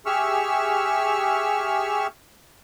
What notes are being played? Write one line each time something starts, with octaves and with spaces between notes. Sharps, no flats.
G4 G#4 E5 C#6 E6 F6